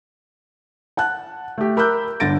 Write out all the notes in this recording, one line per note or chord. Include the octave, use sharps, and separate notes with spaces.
F#5 A5 F#6
A3 G4
A#4 B5 D6 E6 F#6 G6
G1 D3 A6 A#6 D7